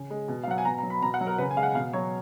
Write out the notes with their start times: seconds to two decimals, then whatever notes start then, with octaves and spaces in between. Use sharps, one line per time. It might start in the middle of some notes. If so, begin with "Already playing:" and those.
Already playing: C#3
0.10 G#3
0.28 B2
0.44 F5
0.47 F#3 F#5
0.58 G#5
0.65 B2 A#5
0.78 A#5
0.83 F#3
0.90 B5
1.02 B2 A#5
1.14 F#5
1.21 F#3
1.27 A#4
1.38 C#3 B4
1.51 G#5
1.57 G#3 F5
1.63 F#5
1.75 B2 F5
1.93 F#3 C#5